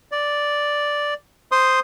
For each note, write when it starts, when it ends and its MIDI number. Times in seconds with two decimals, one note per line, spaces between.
0.12 1.14 74
1.52 1.80 72
1.52 1.80 84
1.52 1.80 87